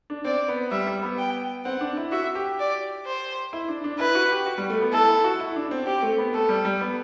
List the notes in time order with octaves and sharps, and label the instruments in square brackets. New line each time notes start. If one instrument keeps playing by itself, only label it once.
[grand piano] D4
[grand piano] C4 [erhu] D5
[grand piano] B3
[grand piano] G3 [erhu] E5
[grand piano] G3
B3
[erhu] G5
[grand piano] C4 [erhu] F#5
[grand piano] D4
E4
[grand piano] F#4 [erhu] E5
[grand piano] G4
[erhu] D5
C5
[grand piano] E4
D4
D4
[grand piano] E4 [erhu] B4
[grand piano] F#4
G4
F#4
G3
A3
B3
[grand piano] E4 [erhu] A4
[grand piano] E4
F#4
E4
D4
C4
[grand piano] C4 [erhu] G4
[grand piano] A3
B3
[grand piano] A3 [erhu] A4
[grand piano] G3
G3
B3